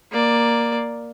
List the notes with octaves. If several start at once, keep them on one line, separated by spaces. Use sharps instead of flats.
A#3 D5